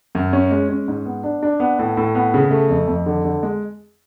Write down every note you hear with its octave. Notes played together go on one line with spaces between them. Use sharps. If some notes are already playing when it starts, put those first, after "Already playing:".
F#2
C#4
G#3
C#4
G#2
B3
D4
D4
B3
A2
A2
B3
C#3
A3
F2
F2
D3
D3
G#3